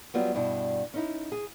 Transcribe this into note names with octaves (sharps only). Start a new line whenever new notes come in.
F#3 G3 B3 F4
G2 B2 D4 E4
C#4 D#4 E4
G#4